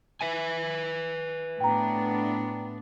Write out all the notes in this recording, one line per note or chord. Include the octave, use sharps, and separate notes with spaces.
B4 E5 G#5
A2 B3 D4 G5 A#5